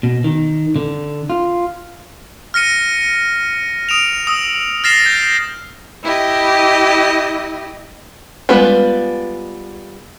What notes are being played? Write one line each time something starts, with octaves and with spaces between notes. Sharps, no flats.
B2
D#3
D3
F4
F6 A#6 C#7 D#7
D#6 D7 E7 F7
D#6 E6
F6 A6 A#6 C7 E7
G6
E4 G4 D#5
G3 G#3 B3 F4 B4